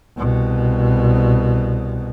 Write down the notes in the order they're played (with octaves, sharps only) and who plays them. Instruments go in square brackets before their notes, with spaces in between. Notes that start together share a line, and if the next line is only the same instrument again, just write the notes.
[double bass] C2 B2